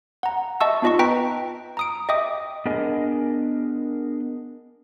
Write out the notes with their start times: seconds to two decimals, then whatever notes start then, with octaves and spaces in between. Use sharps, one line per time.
0.23 F#5 A#5
0.61 D#5 E5 A5 C#6 E6
0.82 B3 D#4 F4 D#5 A5 C#6
0.99 B4 G5 A#5 B6
1.77 A#5 D#6 D7
2.09 D#5 E5 G5 D6 D#6
2.66 B3 D4 G#4 A#4 D#5 G#5